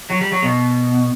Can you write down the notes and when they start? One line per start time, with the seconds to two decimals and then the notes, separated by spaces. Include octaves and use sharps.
0.10 F#3
0.21 G3
0.32 F#3
0.42 B2